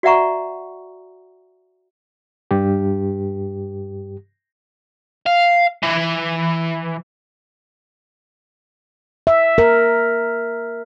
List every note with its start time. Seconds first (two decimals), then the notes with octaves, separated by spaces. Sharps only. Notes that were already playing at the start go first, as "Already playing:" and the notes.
0.03 F#4 D5 E5 F#5 A#5 C#6
2.51 G2 G4
5.26 F5
5.83 E3
9.27 E5
9.58 A#4